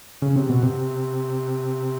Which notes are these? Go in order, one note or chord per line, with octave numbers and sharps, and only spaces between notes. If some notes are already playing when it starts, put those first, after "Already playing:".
C#3
C3
B2
C3